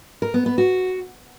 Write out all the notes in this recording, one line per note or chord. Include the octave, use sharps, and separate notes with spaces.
A#4
B3
B3
F#4